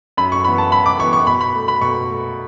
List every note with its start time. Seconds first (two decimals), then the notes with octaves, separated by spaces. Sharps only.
0.17 F#2 B5
0.32 C#6
0.44 E3 B3 B5
0.58 A5
0.72 F#2 B5
0.86 D6
0.99 E3 C#6
1.04 B3
1.13 C#6
1.27 B2 B5
1.41 B5
1.55 A3
1.68 B5
1.81 B2 C#6
2.09 A3